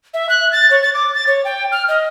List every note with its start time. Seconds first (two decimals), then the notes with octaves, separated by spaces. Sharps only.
0.14 E5
0.29 F#6
0.52 A6
0.70 C#5
0.83 A6
0.94 D6
1.14 A6
1.27 C#5
1.45 G5
1.72 F6
1.88 D#5